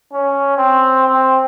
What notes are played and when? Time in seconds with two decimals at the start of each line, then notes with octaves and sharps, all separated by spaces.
0.13 C#4
0.57 C4
1.08 C4